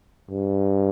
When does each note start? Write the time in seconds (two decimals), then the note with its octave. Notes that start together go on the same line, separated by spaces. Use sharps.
0.30 G2